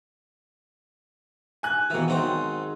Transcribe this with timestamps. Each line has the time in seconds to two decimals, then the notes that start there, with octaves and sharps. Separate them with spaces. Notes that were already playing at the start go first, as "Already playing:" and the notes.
1.63 G#5 F#6
1.90 B2 D#3 E3 A#3 E5
2.08 G#2 F#3 C4 D#4